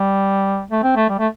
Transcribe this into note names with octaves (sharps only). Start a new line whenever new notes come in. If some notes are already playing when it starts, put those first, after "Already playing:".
Already playing: G3
A3
C4
A3
G3
A3